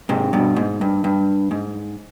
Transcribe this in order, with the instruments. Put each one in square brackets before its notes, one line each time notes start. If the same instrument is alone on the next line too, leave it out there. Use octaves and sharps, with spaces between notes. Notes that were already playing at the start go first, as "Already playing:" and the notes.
[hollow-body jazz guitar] G#2 C3
G2 B2
G#2
G2
G2
G#2